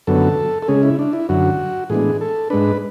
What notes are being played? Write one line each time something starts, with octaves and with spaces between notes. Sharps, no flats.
F#2 D3 F#3 B3 A4
A4
C#3 G#3 C#4 G#4
E4
D4
E4
F#2 D3 F#3 F#4
A2 E3 G#3 B3 D4 G#4
A4
G#2 G#3 D4 B4